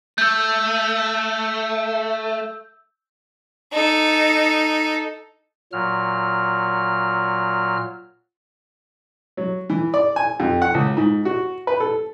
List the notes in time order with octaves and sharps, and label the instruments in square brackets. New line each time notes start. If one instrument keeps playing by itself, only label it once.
[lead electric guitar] A3 [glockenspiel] E6 G6
[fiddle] D#4 A4
[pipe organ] A#2 F#3 F6
[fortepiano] F#3
E3
D5
G#5
F2
F#5
C#2
G#2
F#4
B4
A4